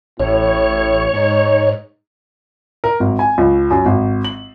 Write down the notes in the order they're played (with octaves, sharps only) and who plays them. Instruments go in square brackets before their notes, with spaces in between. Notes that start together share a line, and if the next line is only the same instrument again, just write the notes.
[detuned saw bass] A1 [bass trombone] A2 [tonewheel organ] C#5
[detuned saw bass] G#2 [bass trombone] D#4
[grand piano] A#4
G#1
G#5
C#2
F#2
G#1
F#7